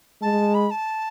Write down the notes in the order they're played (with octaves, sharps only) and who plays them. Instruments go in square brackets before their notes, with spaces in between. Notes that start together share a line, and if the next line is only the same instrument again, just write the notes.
[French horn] G#3 [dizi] A5
[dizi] B5
A5